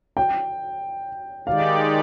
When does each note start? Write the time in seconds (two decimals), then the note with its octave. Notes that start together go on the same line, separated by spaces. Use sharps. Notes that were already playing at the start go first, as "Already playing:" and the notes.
0.17 G5
1.47 D#3 G#3 D#4 G4 D5 F5